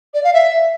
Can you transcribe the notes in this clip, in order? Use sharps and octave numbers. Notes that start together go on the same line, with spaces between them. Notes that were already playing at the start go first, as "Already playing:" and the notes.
D5
F5
E5